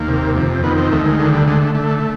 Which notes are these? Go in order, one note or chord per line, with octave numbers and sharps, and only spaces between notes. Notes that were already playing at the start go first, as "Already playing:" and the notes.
Already playing: D#2 A#3
C3
F2
D#3 B3
C4
D2 A3
G#3
D3 G#3
G3
D3 G#3
A3
D3 A3